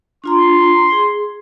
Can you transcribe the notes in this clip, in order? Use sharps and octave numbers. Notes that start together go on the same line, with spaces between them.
D4 F4 A#5 C6
G#4